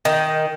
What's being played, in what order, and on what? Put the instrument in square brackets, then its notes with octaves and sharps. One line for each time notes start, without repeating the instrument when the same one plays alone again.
[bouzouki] D#3